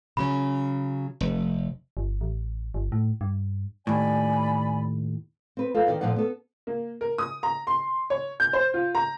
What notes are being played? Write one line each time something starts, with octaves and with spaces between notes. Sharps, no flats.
C#3 F#3 C#4 B5
F1
G1
A1
G1
A2
G2
D#2 A2 D5 G#5 B5
C4 B4
F4 A4
D#3 D5 G5
A#2 D3 F3 D5 F#5
B3 A4
A#3
A#4
D#6
A#5
C6
C#5
G6
C5
F4
A#5